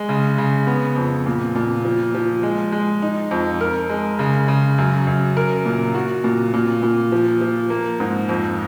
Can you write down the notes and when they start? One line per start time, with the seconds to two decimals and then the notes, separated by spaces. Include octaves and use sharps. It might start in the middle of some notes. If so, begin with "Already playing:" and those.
Already playing: G#3
0.09 C#3
0.38 C#3
0.67 B3
0.96 F2
1.26 A#2
1.55 A#2
1.85 F3
2.14 F3
2.43 G#3
2.72 G#3
3.02 D#4
3.31 F2
3.61 A#4
3.89 G#3
4.19 C#3
4.48 C#3
4.78 F#2
5.07 F#2
5.37 A#4
5.65 A#2
5.95 F#4
6.24 A#2
6.53 A#2
6.83 A#2
7.12 F3
7.41 F3
7.70 A#3
8.00 G#2
8.29 F2